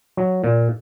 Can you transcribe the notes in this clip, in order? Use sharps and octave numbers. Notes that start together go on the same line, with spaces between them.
F#3
A#2